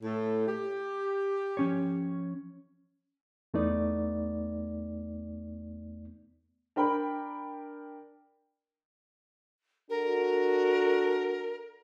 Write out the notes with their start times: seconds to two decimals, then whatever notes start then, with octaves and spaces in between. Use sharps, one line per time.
0.03 A2 A3
0.47 G4
1.57 F3 C#4 C#5
3.54 E2 A3 B3 D#4 D5
6.76 D4 A#4 G5 B5
9.90 D4 F#4 A4 A#4